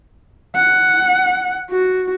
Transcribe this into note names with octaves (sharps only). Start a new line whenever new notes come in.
F#5
F#4